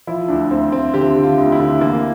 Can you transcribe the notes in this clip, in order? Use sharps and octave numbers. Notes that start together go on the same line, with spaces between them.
F3 E4
D2 D4
D2 C4
D2 C4
D3 G4
D3
F4
D2
E4
D3
E3 A#3